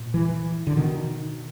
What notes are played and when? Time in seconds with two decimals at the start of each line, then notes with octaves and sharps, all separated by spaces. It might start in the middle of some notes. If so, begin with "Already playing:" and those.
Already playing: A#2
0.14 E3
0.67 D3
0.76 B2 D#3